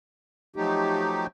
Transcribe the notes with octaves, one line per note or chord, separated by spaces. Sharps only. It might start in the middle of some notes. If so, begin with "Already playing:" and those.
F3 F#3 A3 D#4 G4